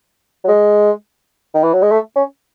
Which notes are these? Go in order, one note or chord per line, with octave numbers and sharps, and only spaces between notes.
F#3
G#3
D#3
E3
F#3
G#3
A3
C#4